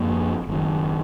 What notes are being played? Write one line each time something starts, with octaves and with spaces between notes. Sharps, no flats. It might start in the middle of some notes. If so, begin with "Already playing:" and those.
Already playing: F#2 F3 A#3 D4
F#1 F#2 D#3